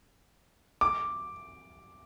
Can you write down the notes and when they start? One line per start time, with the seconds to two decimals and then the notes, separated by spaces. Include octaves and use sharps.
0.81 D6